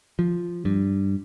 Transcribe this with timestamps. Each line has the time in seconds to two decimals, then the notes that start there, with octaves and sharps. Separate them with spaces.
0.19 F3
0.65 G2